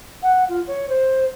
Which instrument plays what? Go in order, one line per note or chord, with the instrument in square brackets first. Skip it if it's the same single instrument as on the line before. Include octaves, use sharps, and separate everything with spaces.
[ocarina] F#5
F4
C#5
C5